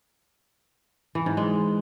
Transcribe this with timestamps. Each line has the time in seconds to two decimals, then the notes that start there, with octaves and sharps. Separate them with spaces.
1.15 E3
1.26 G#2
1.37 G#3